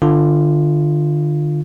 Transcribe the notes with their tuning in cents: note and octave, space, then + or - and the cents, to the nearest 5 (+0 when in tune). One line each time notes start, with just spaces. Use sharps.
D3 +30 F4 +0